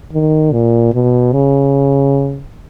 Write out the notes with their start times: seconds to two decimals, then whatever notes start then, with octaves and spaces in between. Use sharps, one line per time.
0.13 D#3
0.53 A#2
0.93 B2
1.33 C#3